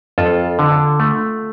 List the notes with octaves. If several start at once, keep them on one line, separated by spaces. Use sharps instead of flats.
F2 F4 A4
D3
A3